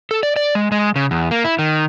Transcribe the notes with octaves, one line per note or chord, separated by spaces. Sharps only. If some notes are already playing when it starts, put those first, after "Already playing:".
A4
D5
D5
G#3
G#3
C#3
E2
A#3
E4
D#3